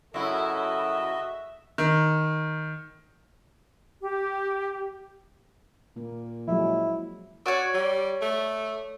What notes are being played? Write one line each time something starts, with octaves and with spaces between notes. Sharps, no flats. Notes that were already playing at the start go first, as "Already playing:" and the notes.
F#2 C#3 E4 F#4 A4 D#5 E5
D#3
G4
A#2 A#3
F3 F#3 G#3 E4
F#4 C#5 D5
G3
A3